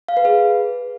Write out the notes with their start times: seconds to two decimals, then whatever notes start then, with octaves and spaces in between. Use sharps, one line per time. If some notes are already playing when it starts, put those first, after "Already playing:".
0.08 F5
0.17 B4
0.25 G#4